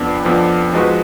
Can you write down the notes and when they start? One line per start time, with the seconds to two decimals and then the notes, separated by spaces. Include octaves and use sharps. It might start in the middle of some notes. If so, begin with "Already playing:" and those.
Already playing: F2 F3 B3 D4
0.25 F2 F3 B3 D4
0.73 F3 G#3 D#4 F#4 B4